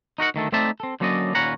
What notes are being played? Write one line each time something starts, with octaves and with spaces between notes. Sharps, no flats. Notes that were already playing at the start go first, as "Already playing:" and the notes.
D#4 F#4 A#4 F#5
D2 D#3 A3 A4
A3 C4 D#4 D5 E5 A5
C4 A4
D3 F#3 A#3 C#4 D5 D#5
D#2 A#2 C#4 B4 F#5 A#5